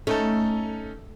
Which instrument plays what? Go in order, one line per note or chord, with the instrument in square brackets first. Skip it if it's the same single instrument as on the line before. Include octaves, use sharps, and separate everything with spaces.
[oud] A3 [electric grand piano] C#4 D#4 A4